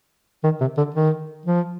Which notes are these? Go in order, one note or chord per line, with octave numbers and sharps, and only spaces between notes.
D#3
C3
D3
D#3
F3